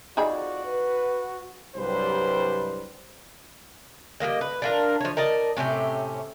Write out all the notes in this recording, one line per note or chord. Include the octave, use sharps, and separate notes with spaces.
F2 D#4 F4 F#4 G#4 D5 B5
B4
C2 G2 F#3 G3 B4 C5
G3 G#3 A#3 D#5
B4
D4 F4 A#4
F3 C#5
A#4 D5 D#5 A5
A2 C3 C#4 G4